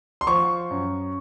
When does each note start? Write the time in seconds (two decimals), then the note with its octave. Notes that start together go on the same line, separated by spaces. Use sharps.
0.21 C6
0.27 F3 C#6
0.71 F#2